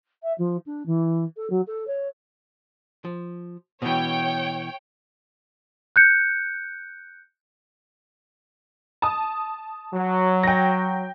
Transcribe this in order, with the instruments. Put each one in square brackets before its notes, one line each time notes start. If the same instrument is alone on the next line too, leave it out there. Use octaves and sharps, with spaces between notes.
[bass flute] E5
F3
D4
E3
A4
F#3
A4
C#5
[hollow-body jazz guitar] F3
[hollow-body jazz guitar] B2 E3 [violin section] C#5 G5
[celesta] F#6 G6 C#7
[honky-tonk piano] A5 D#6
[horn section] F#3
[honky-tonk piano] G5 A#6